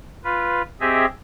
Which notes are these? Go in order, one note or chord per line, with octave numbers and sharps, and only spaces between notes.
F4 B4
C4 G4 G#4 D#5 E5